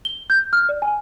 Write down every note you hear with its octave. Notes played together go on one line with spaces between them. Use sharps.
G7
G6
F6
D5
G#5